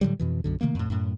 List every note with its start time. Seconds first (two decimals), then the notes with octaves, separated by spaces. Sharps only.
0.01 A2 D3 F#3 G3
0.19 F2 B2 E3
0.44 B1 F#2 D3
0.61 C3 D#3 A3 A#3
0.75 F2 A2
0.90 F#2 A2